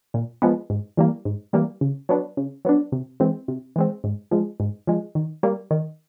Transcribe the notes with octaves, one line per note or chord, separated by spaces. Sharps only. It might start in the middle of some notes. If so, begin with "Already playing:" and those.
A#2
F3 G#3 B3
G#2
E3 G3 A#3
G#2
E3 G3 A#3
C#3
F#3 B3 D4
C#3
F#3 B3 D4
C3
E3 G#3 C4
C3
E3 G#3 C4
G#2
F3 G#3
G#2
F3 G#3
D#3
G3 A#3
D#3